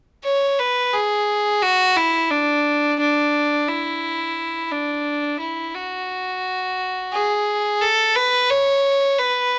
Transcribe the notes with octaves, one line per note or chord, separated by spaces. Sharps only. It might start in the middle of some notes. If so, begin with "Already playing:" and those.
C#5
B4
G#4
F#4
E4
D4
D4
E4
D4
E4
F#4
G#4
A4
B4
C#5
B4